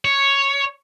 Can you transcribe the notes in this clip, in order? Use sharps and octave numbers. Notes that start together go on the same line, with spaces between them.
C#5